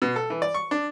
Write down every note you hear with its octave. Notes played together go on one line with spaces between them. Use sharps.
B2
A4
E3
D5
C#6
D4